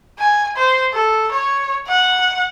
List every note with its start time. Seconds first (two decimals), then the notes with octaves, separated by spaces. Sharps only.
0.19 G#5
0.56 C5
0.93 A4
1.31 C#5
1.87 F#5